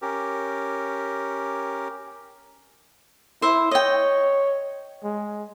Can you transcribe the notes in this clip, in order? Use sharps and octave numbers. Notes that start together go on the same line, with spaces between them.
C#4 G4 A#4
E4 C5 E5
C#5 D#5 G5
G#3